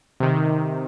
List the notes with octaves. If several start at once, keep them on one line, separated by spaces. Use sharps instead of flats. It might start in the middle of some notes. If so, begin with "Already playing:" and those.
C3 D#3